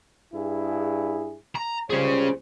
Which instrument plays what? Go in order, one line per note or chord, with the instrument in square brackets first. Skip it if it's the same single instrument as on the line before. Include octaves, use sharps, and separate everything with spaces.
[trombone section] G2 E4 G#4
[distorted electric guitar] A#5
[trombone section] C#2 G3 C5 [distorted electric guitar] C#4 G#4